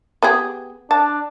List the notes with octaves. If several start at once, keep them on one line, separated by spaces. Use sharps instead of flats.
B3 G4 G#4
D4 A5